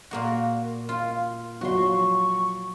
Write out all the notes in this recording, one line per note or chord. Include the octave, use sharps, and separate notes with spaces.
A#2 A#3 F#4
F4
F3 F#3 F#4 C#5 C6 C#6